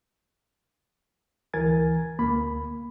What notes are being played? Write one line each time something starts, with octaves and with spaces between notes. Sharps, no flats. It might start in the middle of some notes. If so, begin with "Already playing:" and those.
D2 E3 A#4 G#5 G#6 A6
D2 A#3 B5